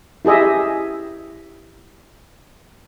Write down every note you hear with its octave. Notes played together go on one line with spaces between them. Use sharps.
E4 G4 G#4 D#5 E5